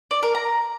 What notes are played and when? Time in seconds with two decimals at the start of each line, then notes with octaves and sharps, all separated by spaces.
0.11 D5
0.23 A#4
0.35 A#5